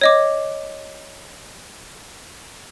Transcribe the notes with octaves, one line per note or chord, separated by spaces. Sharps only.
C#5 D#5 D6